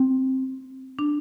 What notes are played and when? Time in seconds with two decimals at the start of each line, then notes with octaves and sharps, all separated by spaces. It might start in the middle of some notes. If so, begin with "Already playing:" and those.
Already playing: C4
0.99 D4